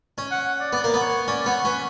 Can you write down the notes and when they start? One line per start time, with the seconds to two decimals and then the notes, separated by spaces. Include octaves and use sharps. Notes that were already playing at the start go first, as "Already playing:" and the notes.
0.18 C#4
0.31 F#5
0.46 F#5
0.60 D5
0.73 B3 D5
0.84 A#3
0.94 B3
1.00 C#5
1.27 C#4 D5
1.45 B3 C#5
1.64 C#4 B4